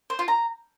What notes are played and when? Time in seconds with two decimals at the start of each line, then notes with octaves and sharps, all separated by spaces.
0.10 C5
0.19 F4
0.28 A#5